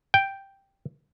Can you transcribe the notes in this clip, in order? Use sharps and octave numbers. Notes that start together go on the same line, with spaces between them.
G5